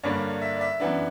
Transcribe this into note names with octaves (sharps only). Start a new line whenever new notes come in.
G2 D3 G3 A#3 D4 C#5
E5
D5
E5
F#2 E3 B3 D4